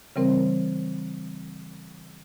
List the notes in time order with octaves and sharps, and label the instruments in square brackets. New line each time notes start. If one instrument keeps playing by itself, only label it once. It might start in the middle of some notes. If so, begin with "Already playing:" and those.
[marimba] C#3 E3 G3 C4 A#4 C5